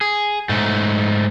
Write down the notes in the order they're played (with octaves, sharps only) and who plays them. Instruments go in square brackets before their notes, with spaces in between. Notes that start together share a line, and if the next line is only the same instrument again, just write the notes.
[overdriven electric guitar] G#4
G#2 A3